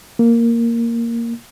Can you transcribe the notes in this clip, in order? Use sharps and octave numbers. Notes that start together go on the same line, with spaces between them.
A#3